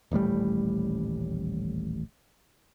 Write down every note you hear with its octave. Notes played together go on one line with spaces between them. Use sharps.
D#1 A1 A2 G3